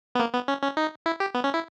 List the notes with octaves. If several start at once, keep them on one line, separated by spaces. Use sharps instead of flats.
B3
A#3
B3
C#4
C#4
D#4
E4
G4
B3
C#4
E4